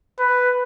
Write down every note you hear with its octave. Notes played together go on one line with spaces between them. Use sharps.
B4